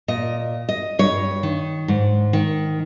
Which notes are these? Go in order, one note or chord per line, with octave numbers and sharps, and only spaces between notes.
A#2 D#5
D#5
G2 C#5
D#3
G#2
D#3